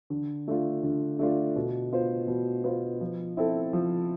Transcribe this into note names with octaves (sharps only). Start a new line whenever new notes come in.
D3
A3 D4 F4
D3
A3 D4 F4
B2
B3 F4 C5
B2
B3 F4 C5
F3
C4 E4 A4
F3